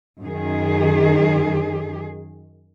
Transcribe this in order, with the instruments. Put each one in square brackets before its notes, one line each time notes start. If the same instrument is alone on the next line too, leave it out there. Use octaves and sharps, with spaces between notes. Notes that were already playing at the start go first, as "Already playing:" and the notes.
[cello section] F#2 D#3 G#4